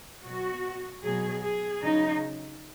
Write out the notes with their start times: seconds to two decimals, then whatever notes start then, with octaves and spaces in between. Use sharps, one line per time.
0.24 B2 F#3 F#4
1.03 B2 F#3 G#4
1.42 G#4
1.82 C#3 F#3 D#4